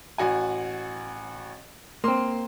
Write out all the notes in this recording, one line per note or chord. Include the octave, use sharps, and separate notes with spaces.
A1 F#4 G#5
A#3 C4 C6